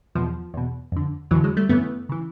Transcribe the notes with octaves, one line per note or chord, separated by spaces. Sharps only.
E2 B2 F3
E2 B2
F2 D3
F2 D3 E3 F#3
F#3 G#3
G3 A3
F#2 C#3 E3 A3 B3
C#3 E3